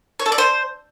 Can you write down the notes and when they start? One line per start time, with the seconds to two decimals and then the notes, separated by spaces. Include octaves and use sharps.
0.19 C#5
0.26 A4
0.32 D5
0.38 C5